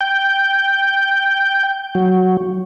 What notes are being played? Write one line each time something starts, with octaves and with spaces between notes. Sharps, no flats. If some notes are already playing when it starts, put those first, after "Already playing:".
G5
F#3